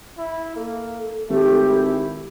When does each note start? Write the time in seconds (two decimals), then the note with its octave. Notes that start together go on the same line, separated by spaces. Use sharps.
0.18 E4
0.56 A#3 A4
1.29 G#1 A3 G4
1.69 E4